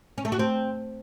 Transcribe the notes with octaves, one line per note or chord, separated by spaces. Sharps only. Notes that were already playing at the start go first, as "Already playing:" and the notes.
C#4
A3
F#4
C4